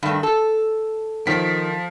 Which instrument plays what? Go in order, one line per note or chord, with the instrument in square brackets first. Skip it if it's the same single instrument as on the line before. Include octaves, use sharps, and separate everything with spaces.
[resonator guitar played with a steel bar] G2 D#3 A3
A4
[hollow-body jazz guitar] D#3 [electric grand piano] F3 B6